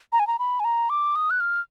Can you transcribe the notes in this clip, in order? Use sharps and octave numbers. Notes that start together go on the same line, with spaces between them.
A#5
G#5
A#5
B5
G#5
A#5
D6
D#6
F#6
F6